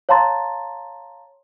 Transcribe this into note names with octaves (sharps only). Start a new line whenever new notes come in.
C#5 F5 A5 A#5 C6 A6